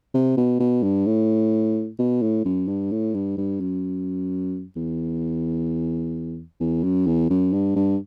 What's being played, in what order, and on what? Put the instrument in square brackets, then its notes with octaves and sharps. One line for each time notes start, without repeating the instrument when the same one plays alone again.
[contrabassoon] C3
B2
B2
G2
A2
B2
A2
F#2
G2
A2
G2
G2
F#2
E2
E2
F#2
E2
F#2
G2
G2